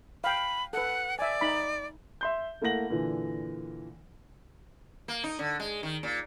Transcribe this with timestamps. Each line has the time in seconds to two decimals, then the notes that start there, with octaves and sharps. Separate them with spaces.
0.24 F5 G5 B5
0.73 A4 B4 F#5
1.19 D5 E5 G#5
1.41 D#4 B5
2.21 E5 C6 G6
2.62 A3 A#3 E4 F#5 A#6 F#7
2.90 A#2 D3 E3
5.08 A#3
5.24 D#4
5.39 D3
5.60 G#3
5.83 D#3
6.03 A#2